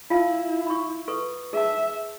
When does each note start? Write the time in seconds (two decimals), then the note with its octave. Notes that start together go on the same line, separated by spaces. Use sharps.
0.10 E4 F4 F5 A5
0.67 B5 C#6
1.08 A4 B4 C#6
1.53 G#4 E5 A5